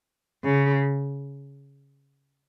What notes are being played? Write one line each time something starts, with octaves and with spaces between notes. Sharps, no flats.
C#3